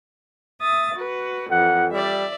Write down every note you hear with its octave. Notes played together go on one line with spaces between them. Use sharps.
E5 D#6 A6
F#4 B4
F2 E3 F#5
G3 D5 E5